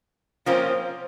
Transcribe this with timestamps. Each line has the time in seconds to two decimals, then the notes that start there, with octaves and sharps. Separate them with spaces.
0.46 F3 A#3 C4 C#4 F4